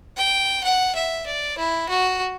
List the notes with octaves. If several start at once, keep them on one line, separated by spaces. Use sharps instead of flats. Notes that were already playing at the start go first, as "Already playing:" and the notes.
G5
F#5
E5
D5
E4
F#4